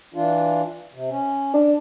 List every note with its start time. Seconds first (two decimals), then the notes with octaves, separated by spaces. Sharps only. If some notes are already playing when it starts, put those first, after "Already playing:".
0.14 E3 D4 F4
0.94 C3
1.10 C#4
1.54 D4